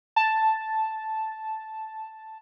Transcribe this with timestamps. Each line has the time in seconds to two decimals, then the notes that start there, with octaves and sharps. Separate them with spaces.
0.16 A5